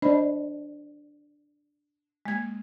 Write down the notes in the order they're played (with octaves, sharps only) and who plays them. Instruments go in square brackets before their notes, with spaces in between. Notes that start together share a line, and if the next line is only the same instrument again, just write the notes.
[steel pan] D4 [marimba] C5 D#5 B5
[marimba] G#3 A#3 G#6